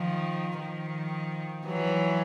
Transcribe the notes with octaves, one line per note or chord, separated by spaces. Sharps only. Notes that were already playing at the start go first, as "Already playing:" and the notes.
Already playing: D#3 F3
D#3 F3
E3 F#3